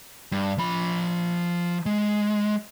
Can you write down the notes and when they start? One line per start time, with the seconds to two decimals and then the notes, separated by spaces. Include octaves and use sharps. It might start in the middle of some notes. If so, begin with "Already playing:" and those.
0.32 G2
0.58 F3 B5
1.86 G#3